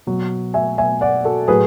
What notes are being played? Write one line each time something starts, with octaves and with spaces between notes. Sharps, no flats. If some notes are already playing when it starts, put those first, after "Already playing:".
B2 F#3
E5 G#5
B2 F#3 E5 G#5
D5 F#5
F#4 A4
A2 F#3 G#4 B4